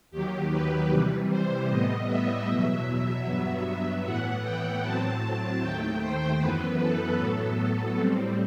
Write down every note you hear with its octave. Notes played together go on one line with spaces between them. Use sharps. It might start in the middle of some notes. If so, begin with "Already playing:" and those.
D#2 D#3 F#3 G4
B4
C3 E3 G3
C5
A2 G3 B3 D#5
E5
E2 B2 F#3
E5
G2 F#3 B3
A2 E3 B3 F#5
G5
A2 F#3 C4 A5
D#2 D#3 A3 G5
C5
F#2 E3 B3 B4
A4
A2 F#3 B3 A4
A2 G3 C4